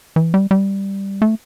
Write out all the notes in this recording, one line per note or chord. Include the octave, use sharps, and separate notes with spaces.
E3
G3
G3
A3